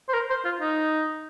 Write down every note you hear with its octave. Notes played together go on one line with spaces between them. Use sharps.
C5
A#4
C5
F4
D#4